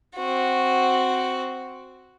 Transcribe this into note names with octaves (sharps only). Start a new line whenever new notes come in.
C4 F#4